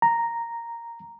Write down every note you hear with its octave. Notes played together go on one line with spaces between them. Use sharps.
A#5